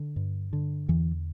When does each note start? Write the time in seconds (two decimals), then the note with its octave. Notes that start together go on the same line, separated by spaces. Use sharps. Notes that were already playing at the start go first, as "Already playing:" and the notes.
Already playing: D3
0.16 G2
0.53 D3
0.88 E2 E3